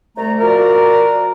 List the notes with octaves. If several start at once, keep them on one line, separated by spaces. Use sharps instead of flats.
C2 A3 A#5
F3 F#4 A#4 D5